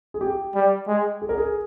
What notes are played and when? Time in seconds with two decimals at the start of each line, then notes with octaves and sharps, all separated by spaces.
0.14 G#4
0.21 G4
0.55 G3
0.88 G#3
1.22 G#4
1.29 A#4
1.38 G#4